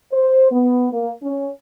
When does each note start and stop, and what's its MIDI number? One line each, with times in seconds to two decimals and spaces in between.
0.12 0.48 72
0.51 0.87 59
0.92 1.11 58
1.23 1.49 61